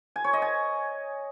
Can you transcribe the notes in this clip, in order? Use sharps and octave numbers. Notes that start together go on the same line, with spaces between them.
G#5
C#5
D#5
G#5